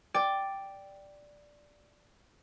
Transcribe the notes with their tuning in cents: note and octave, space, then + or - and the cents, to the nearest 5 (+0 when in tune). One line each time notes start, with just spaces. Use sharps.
D5 +0 G5 +0